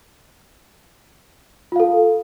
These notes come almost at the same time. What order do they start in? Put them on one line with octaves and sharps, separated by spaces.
F4 F5 A4